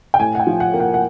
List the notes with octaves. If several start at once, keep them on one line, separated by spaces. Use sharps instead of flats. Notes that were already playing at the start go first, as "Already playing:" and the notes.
G5
A2 G#5
F#5
G5
F3
F#5
A#3
F#5
F#5